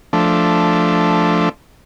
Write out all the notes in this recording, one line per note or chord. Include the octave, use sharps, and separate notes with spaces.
F3 A3 D4